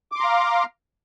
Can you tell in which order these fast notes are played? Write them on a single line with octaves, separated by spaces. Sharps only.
D6 C6 A#5 F5